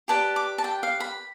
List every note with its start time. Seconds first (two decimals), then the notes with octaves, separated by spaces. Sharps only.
0.08 G4 B4 D5 A5
0.36 D6
0.58 A5
0.64 G5
0.83 F5
1.00 B5